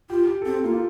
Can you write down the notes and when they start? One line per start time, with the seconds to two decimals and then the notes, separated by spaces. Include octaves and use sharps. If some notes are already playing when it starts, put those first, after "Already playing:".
0.10 F4 G4
0.27 G4
0.42 A4
0.45 C4 G4
0.64 A#3 F4
0.74 F4